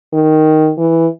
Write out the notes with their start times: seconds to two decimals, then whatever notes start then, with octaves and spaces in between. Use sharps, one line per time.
0.13 D#3
0.78 E3